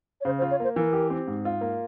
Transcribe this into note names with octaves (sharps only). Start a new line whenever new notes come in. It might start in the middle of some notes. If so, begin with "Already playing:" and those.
C#5
C#3 C5
C5
F4
C#5
A#3 C5
E3 A#4
G4
C4
G#2
F4
A#3